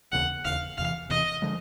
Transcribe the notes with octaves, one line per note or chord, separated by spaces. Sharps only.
E1 D#2 C#3 F#5
E1 D#2 C#3 F5
E1 E2 C3 E3 F5
E1 E2 C3 E3 D#5
D3 F3 G#3